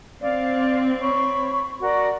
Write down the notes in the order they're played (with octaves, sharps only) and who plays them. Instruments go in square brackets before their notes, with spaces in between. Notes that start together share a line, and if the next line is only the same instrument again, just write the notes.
[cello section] C4 [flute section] D5 F5
[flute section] C#5 B5 C#6
F#4 A#4 D5